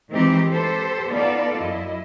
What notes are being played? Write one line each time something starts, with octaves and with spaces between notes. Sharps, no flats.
D#3 E3 G#3 C4 D#4 G4
G4 A4 B4 C5
B3 D#4 F4 A4 D5 F5
F#2 E4 D#5